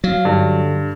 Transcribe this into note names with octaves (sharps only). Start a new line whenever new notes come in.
F#3 F5
G2 D3